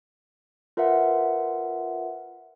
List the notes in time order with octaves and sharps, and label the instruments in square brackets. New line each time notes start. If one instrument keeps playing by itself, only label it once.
[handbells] F4 A#4 B4 E5 F#5